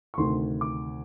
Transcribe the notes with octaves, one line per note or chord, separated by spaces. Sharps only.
C#6
D2 C3 D#3 C6
D6